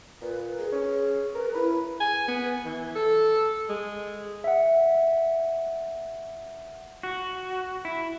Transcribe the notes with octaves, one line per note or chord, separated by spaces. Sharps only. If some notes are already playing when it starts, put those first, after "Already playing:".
A#2 B4
G#4
C#4
A#4 B4
E4 B4
G#5
B3
E3
A4
G#3
E5 F#5
F#4
E4